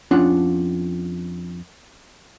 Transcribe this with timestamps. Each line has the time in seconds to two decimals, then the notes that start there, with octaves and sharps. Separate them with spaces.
0.11 F2 C#4 D4 F4 F#5